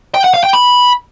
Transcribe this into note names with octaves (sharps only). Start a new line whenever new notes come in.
G5
F#5
F5
G5
B5